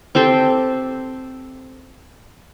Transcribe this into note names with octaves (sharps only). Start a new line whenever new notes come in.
C4 G4 A4 C5